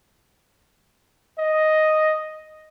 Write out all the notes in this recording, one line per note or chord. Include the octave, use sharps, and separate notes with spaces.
D#5